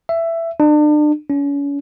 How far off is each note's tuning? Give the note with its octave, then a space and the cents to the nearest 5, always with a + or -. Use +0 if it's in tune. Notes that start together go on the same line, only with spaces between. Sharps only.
E5 +15
D4 +35
C#4 +35